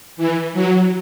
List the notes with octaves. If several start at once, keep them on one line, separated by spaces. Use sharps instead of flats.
E3
F#3